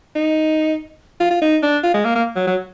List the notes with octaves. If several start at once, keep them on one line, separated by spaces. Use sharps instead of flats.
D#4
F4
F4
D#4
D4
F4
G#3
A#3
A#3
F#3
F#3